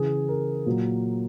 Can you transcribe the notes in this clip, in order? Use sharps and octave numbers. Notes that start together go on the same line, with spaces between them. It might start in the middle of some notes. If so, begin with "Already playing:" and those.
Already playing: C#3 E3 G#4
A#4
A#2 F#3